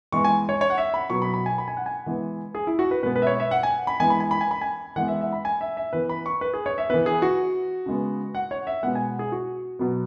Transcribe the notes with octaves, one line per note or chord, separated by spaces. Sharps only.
E3 G#3 B3 C#6
G#5
C#5
C#5
F#5
E5
B5
B2 F#3 B3 C#6
B5
B5
G#5
B5
G#5
F#5
G#5
E3 G#3 B3
G#4
E4
F#4
B4
B2 G#3 B3 B4
B4
E5
C#5
E5
F#5
G#5
B5
E3 G#3 B3 G#5
B5
G#5
B5
G#5
B5
G#5
E3 G#3 B3 F#5
E5
E5
B5
G#5
E5
E5
E3 B3 B4
B5
C#6
B4
G#4
C#5
E5
E3 B3 B4
G#4
F#4
C#3 G#3 B3
F#5
C#5
E5
B2 G#3 B3 F#5
G#5
G#4
F#4
B2 F#3 B3